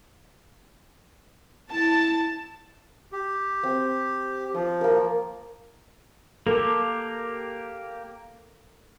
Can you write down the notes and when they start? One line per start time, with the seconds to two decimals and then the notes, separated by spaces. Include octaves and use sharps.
1.71 E4 A5
3.12 G4
3.63 C4
4.54 F3 D#6
4.81 A#3 A#4
6.47 A#3 G4 A4 A#4